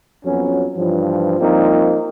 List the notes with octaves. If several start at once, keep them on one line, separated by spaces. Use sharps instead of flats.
F2 F#3 B3 C#4
G2 E3 F3
F3 G3 A#3 C4 D#4